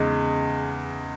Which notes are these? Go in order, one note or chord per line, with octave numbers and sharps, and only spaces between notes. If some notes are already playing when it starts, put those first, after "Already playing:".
Already playing: E2 C#3 G#3 D#4